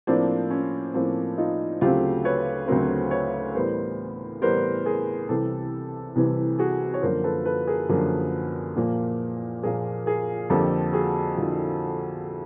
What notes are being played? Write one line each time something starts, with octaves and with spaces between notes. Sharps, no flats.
A2 F3 A#3 C4 D4
C#4
A2 F3 A#3 C4
D#4 F4
D2 C#3 F#3 A3 C4 F4 G4
B4 C#5
D2 C#3 F#3 A3 C4 A#4 C5
B4 C#5
A2 E3 G3 B3 A#4 C5
A2 E3 G3 B3 A#4 C5
G#4 A#4
C2 C3 E3 G4 A4
C2 C3 E3
F#4 G#4
C#5
F#2 D3 F3 A#3 A#4 C5
A4 B4
A4 B4
G#4 A#4
F#2 D3 F3 A#3
A#2 F3 A#3
A#2 F3 A#3 G#4 A#4
G#4 A#4
F2 D3 F3 A#3 G4 A4
F#4 G#4
D3 F3 A#3 E4 F#4